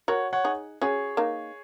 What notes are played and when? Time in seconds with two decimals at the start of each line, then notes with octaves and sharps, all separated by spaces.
0.08 F#4 A#4 C#5 F#5
0.33 C#5 F#5
0.44 D#4 G#4
0.82 C#4 F#4 G#4 C#5
1.17 A#3 D#4